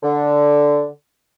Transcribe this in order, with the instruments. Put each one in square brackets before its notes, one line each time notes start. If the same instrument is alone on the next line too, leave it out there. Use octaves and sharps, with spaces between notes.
[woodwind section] D3